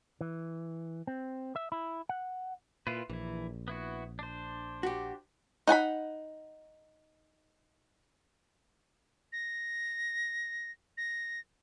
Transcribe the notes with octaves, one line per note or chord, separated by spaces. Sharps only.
E3
C4
E5
E4
F#5
A#2 E4 F4 B4
A#1 E3 E4
B3 E4 F#4
D4 C5
F#4 G4
D#4 F#5 G#5 B5
A#6
A#6